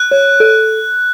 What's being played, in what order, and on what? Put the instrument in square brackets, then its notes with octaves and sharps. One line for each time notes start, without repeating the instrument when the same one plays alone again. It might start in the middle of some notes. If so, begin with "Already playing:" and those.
Already playing: [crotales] F#6
[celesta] C#5
A4